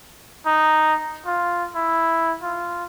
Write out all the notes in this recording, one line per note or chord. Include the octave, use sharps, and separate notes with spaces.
D#4
F4
E4
F4